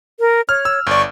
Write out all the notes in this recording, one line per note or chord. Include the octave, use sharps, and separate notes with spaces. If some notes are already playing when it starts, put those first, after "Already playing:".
A#4
C#5 F6
E6
G1 D5 C#6